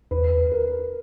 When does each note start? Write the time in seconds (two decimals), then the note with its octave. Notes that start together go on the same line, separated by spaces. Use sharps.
0.11 E2 B4
0.52 A#4